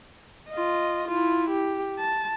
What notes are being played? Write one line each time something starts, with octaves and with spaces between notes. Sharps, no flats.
F4 D#5
E4 F4
G4
A5